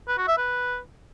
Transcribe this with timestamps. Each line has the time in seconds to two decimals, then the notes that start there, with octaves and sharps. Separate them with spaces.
0.08 B4
0.18 F#4
0.28 E5
0.38 B4